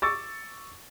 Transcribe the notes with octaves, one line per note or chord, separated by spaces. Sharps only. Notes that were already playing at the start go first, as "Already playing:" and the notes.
C#6 D6 E6 A6